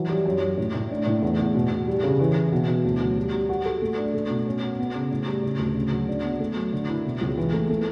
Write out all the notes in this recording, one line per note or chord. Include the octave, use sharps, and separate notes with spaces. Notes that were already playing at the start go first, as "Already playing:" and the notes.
Already playing: E3 F#3
G3
F#2
F#2
A2
A2
D4
A2
E2
E2
B2
B2
G3
C#3
E3
E3
B2
B2
D2
F#3
G3
G3
F#4
A4
A3
D4
A3
B2
C#4
F#4
B3
C#3
A2
G3
C#3
D2
C#3
F#3
D4
B3
A3
F#3
D3
E4
B2
C#2
E3
A3
A3